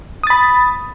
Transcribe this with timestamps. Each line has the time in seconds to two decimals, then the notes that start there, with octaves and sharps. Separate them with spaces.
0.23 D#6
0.27 A6
0.30 B5